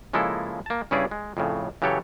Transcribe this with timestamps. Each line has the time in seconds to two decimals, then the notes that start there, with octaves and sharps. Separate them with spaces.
0.13 C#3 F3 G#3 A#3 E4 A4
0.66 A#3 A5
0.91 G2 C#3 C#4 E4 G#4 D5
1.11 G#3
1.37 F2 A2 C#3
1.82 C#3 E3 F#3 G4 A4 C#5